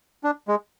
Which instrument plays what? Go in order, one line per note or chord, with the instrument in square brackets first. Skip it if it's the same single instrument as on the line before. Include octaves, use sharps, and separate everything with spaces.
[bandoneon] D4
G#3